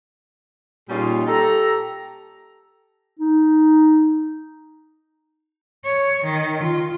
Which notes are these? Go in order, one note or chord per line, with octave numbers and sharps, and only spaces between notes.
A#2 G3 C#4 D#4 F4 G#4
G4 A4 A#5
D#4
C#5
D#3
F4